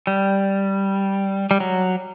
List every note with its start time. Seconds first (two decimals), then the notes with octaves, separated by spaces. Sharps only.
0.07 G3
1.51 G3
1.60 F#3